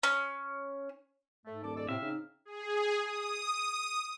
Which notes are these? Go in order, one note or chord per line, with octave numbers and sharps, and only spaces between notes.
C#4
G#2 A3
D#1 A4 D5 D6
G#3 A4 D5
A2 C3 C4 E5 F5
C#3 D#4
G#4
D#6